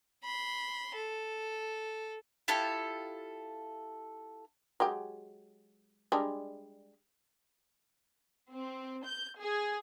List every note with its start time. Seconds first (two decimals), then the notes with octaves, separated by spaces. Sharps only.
0.24 B5 C6
0.95 A4
2.48 E4 F4 G4 A4
4.80 F#3 G#3 G4
6.12 G3 G#3 D4
8.52 C4
9.05 G6
9.40 G#4